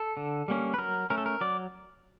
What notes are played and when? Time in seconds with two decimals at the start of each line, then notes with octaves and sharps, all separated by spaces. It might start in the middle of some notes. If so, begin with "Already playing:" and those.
Already playing: A4
0.17 D3
0.48 G3 A#3 C#4
0.74 B4
0.79 F#3 A#4
1.10 A3 C#4 A#4
1.18 A4
1.26 A#4
1.41 F#3 D5